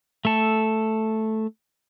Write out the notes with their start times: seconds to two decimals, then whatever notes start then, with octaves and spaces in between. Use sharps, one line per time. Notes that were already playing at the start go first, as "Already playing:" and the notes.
0.25 A3 A4